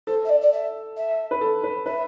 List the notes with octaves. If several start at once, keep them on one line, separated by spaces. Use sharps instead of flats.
A4 C5
E5
D5
D5
E5
E5
B4
A4
B4
B4 E5